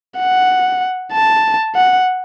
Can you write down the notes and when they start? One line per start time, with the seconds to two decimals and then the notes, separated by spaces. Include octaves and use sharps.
0.18 F#5
1.13 A5
1.76 F#5